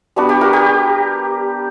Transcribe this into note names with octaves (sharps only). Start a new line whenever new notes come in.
G3 B3 D4 F#4
G4
F#4 A#4
G4